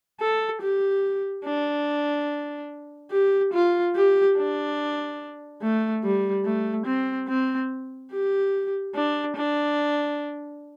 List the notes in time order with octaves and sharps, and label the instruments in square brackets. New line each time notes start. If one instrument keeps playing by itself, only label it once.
[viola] A4
G4
D4
G4
F4
G4
D4
A3
G3
A3
C4
C4
G4
D4
D4